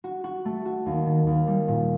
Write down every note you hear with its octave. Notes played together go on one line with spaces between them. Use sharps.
F#4
F#4
A3
F#4
D#2
D#3
D#2
G3
A#2